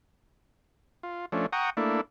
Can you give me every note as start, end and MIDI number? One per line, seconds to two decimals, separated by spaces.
1.03 1.26 65
1.32 1.46 53
1.32 1.46 57
1.32 1.46 61
1.32 1.46 62
1.53 1.70 78
1.53 1.70 79
1.53 1.70 82
1.53 1.70 85
1.53 1.70 87
1.77 2.01 57
1.77 2.01 58
1.77 2.01 62
1.77 2.01 64